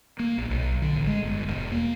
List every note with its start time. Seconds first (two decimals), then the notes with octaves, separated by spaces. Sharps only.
0.19 A#3
0.38 A#1
0.50 B1
0.82 D3
0.96 A1
1.07 G#3
1.24 G1
1.48 E1
1.72 A#3